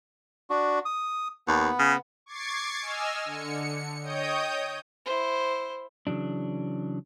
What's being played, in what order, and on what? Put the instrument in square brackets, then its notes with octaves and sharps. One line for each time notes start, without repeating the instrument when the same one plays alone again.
[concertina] D4 F#4
D#6
[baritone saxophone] D#2 [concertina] B3
[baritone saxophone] C#3
[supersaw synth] C#6 D6 G#6 A6 C7
D#5 G#5 E6 F6
D3 C#7
C#5 D#5 G5 D#6 G6
[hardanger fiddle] E4 C5
[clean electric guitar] C#3 E3 F#3 D4